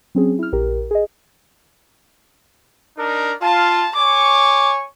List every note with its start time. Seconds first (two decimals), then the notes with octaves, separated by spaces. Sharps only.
0.15 F#3 C4 C#4 G#4
0.39 E4 F6
0.52 A#1 G4 A#4
0.91 G#4 D#5
2.97 D4 D#4 A#4
3.42 F4 A5
3.96 C#5 G#5 C#6 D6